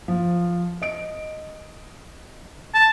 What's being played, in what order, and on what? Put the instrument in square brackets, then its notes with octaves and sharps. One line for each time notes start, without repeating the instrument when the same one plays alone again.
[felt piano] F3
D#5 D7
[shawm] A5